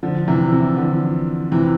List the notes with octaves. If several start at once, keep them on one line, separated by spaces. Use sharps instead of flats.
D3 F3
C3 E3
C3 E3
D3 F3
C3 E3